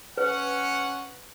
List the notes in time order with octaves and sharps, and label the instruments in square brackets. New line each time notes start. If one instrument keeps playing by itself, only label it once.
[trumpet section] C#4 F#5 [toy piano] B4